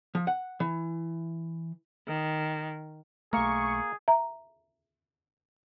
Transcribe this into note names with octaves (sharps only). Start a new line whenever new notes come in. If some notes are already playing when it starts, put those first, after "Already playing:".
F3
F#5
E3
D#3
B1 A3 A#3 G#4 A#4 C#6
E5 A#5